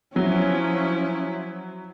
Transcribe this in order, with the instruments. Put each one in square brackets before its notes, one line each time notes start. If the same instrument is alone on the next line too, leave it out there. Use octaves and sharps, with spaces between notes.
[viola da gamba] F3 E4 [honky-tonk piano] F#3 [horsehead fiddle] C#4